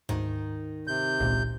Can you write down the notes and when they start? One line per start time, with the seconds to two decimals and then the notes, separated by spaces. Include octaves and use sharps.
0.09 D2 G#2 D#3
0.87 C3 G6
1.20 G#1 C#2 A#2